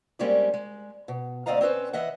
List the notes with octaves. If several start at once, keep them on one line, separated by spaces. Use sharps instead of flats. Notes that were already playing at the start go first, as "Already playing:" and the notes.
G3 G#3 A#3 C4 C#4 D5
G#3
B2
D2 C4 D5 D#5 F5 A#5
C4 C#4 B4 C5
E3 D#5 E5 F#5